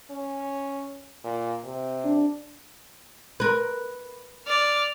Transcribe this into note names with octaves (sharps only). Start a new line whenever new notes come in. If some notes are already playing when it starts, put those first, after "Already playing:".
C#4
A#2
C3
D4
A#4 B4
D5 F6